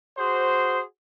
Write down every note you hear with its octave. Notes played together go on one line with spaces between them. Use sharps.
F#4 G#4 C5